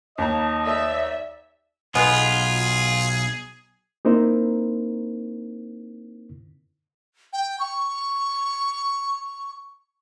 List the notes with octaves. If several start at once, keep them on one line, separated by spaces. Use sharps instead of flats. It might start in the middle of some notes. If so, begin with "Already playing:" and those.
D#2 D#5 F5 A5 A#5
D5 E5
B1 G#3 B3 F4 G#4
A#3 C4 D#4 E4 A#4 C5
G5
C#6